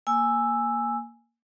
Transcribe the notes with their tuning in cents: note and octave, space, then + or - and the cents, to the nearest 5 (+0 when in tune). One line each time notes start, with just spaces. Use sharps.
A#3 +0 G#5 +0 E6 +0